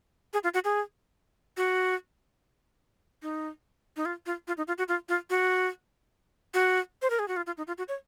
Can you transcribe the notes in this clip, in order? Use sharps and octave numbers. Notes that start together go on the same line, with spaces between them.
G#4
F4
F#4
G#4
F#4
D#4
D#4
F4
F4
F4
D#4
F4
F#4
F4
F4
F#4
F#4
C5
A#4
G#4
F#4
F4
F4
D#4
F4
F#4
C#5